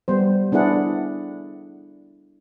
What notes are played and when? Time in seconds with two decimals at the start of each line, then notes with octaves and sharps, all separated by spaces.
0.08 G3 B3 C5
0.52 B3 D4 E4 G#4 F#5